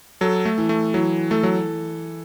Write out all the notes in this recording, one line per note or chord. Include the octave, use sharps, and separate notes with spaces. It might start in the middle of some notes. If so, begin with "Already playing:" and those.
F#3 A4
A3
E3
A3
E3 F#3
A3 A4
F#3